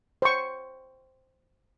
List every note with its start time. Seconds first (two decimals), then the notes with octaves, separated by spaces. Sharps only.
0.22 C5 C#6